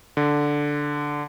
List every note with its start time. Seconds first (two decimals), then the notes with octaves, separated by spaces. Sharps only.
0.17 D3